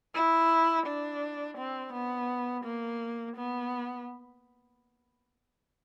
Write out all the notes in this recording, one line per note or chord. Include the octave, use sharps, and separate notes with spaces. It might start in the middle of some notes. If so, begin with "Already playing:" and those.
E4
D4
C4
B3
A#3
B3